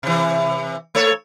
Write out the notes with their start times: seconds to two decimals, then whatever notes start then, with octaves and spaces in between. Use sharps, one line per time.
0.03 C3 E3
0.95 A3 A4 C#5